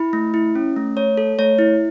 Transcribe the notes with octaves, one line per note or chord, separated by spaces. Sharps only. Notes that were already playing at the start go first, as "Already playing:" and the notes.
Already playing: E4 B5
A3
E4
C#4
A3
A3 C#5
A4
A3 C#5
E4